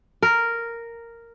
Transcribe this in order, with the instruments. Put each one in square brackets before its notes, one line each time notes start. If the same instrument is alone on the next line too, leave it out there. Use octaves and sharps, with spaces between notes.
[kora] A#4